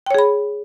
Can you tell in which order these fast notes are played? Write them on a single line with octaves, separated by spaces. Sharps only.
G5 C#5 G#4 B5